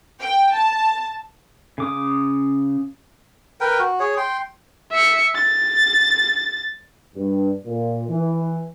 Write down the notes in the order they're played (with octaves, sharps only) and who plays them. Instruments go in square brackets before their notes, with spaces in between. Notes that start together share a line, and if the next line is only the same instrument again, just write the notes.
[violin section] G5
A5
[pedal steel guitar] C#3 D6 D#6
[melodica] A#4 B4 G5
F#4
G#4 C#5
G5 C6
[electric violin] E5 C#7
A6
[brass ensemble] G2
A#2
E3